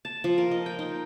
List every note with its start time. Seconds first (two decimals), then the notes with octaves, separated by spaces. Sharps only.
0.05 A5
0.24 F3
0.38 A#4
0.51 D#5
0.66 G5
0.79 D#4